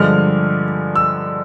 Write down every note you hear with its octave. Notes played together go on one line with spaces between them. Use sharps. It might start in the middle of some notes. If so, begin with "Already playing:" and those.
Already playing: G2 D3 F3 G#3 F6
E6